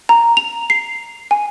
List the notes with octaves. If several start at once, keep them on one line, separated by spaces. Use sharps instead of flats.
A#5
F7
C7
G#5